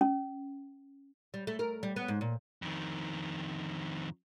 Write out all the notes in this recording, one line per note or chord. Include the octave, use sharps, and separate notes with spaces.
C#4
G3
A3
A#4
G3
B3
G#2
A#2
F2 D#3